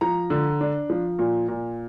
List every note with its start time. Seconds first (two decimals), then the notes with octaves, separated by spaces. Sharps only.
0.01 F3 A#5
0.30 D3
0.61 D4
0.90 F3
1.19 A#2
1.48 A#2